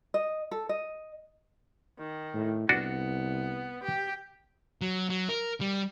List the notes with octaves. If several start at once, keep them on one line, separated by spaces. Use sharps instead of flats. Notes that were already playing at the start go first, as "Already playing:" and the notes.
D#5
A4
D#5
D#3
A2
C2 B3 D4 F#4
G4
F#3
F#3
A#4
G3